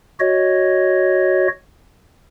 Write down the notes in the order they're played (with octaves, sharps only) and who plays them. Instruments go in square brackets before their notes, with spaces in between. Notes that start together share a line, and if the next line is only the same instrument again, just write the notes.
[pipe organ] F#4 C#5 D#5